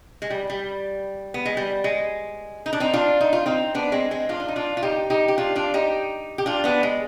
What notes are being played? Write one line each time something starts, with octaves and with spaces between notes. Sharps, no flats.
G#3
G3
G3
B3
G#3
G3
G#3
D#4
D4
C4 D#4
D4 F4
D#4
F4
C4 D#4
B3 D4
G#3 C4
G#3 C4
D4 F4
D4
D#4
D4 F4
F4
D#4 G4
D#4 G4
G4
D4 F4
D4 F4
D#4 G4
G4
D4 F4
B3 D4
G#3